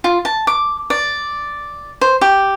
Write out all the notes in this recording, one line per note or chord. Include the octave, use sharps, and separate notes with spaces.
F4
A5
D6
D5
C5
G4